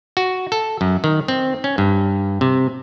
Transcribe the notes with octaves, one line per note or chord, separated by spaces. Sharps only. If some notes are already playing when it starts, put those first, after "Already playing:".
F#4
A4
F#2
D#3
C4
C#4
G2
C3